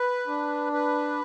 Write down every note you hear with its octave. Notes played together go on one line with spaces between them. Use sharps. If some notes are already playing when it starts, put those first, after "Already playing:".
Already playing: B4
D4
B4